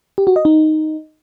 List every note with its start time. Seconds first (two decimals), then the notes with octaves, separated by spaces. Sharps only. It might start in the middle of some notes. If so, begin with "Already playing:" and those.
0.18 G4
0.27 F#4
0.36 D#5
0.45 D#4